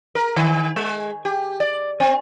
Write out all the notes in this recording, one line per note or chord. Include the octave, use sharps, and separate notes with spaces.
A#4
D#3
G#3
G4
D5
C4